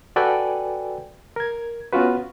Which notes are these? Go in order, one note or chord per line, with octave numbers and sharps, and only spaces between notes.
F#4 A4 B4 D5 G5 G#5
A#4 G#6
B3 C#4 F4 F#4 B4